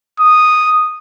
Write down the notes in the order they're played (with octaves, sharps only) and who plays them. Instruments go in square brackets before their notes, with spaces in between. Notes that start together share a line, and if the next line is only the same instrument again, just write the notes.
[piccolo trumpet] D#6